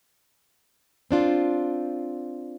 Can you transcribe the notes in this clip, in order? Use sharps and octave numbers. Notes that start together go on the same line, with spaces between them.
C4 D4 F4